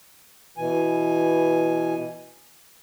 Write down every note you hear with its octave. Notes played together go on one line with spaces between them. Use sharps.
B2 E3 G#5